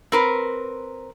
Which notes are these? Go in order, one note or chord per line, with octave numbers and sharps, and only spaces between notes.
C4 A#4 B4